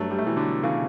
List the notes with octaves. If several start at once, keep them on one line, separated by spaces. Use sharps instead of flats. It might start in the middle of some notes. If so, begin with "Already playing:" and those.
Already playing: G2 F#3 A3
G3
A3
B2 E3 G3
D3 F#3
C#3 E3